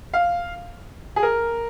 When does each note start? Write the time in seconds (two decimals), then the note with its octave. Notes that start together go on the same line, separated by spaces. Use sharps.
0.13 F5
1.16 G#4
1.23 A#4